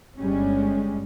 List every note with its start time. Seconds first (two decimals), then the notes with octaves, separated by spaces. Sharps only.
0.19 G1 G3 G#3 C#4